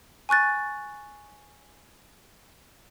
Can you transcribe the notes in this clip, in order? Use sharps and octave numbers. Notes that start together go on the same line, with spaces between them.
G#5 C#6 F#6 A6